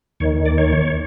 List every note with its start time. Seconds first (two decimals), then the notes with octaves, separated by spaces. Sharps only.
0.20 D#2 D#3 C#5
0.46 D5
0.58 C#5